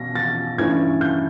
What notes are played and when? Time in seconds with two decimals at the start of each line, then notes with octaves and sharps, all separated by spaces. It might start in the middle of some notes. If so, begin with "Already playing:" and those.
Already playing: B2 A#6
0.15 A6
0.58 G2 E3 A3 C#4 G#6
1.01 G6